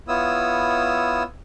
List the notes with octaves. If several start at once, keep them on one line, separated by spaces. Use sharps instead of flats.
B3 E4 F4 C#5 D#6 E6